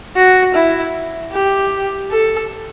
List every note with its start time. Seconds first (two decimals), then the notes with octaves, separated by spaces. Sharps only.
0.16 F#4
0.55 E4
1.32 G4
2.11 A4